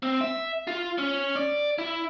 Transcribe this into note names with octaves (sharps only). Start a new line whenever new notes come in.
C4
E5
F4
C#4
D5
E4